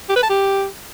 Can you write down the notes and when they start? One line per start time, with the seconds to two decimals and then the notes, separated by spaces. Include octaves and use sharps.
0.09 G4
0.16 B4
0.23 A5
0.30 G4